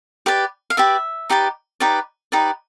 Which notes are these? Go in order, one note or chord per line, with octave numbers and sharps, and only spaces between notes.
G4 B4 D5
F5
G4 B4 D5 E5
D#4 G4 B4 D5
D#4 G4 B4 D5
D#4 G4 B4 D5